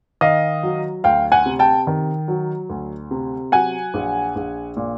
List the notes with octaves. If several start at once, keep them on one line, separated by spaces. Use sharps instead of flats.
D#3 D#5 F5
F#3
D2 F5 G5
F#5 G#5
C3
G5 A5
D#3
F#3
D2
C3
F#3 F#5 G#5
A#1
A#1
A#2